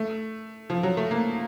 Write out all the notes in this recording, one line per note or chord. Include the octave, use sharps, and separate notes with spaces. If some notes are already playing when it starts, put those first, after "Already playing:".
Already playing: A3
F3
F#3
A3
A#3